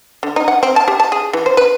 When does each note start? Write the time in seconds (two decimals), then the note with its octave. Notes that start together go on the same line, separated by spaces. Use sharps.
0.23 D3
0.36 D#4
0.48 F#5
0.63 C4
0.76 A5
0.88 G4
1.00 A5
1.12 G#4
1.33 E3
1.46 C5
1.57 B4